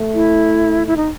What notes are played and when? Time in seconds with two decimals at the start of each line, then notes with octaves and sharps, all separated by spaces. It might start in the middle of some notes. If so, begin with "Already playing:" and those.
Already playing: A3
0.14 E4
0.87 E4
0.97 D#4